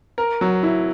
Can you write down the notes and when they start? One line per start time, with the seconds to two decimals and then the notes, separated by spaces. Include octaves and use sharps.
0.18 A#4
0.41 F#3
0.63 E4